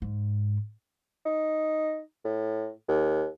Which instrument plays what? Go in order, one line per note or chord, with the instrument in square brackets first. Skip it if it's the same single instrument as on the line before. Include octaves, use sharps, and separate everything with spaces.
[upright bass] G#2
[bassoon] D#4
A2
D#2